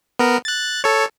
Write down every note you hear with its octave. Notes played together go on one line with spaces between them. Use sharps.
B3 A#4
F#6 A6
A4 C#5